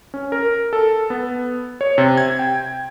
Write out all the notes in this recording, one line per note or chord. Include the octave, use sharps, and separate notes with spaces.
C#4
A#4
A4
B3
C#5
C3
G#6
G5